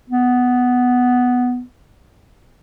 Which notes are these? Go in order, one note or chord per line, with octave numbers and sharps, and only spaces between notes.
B3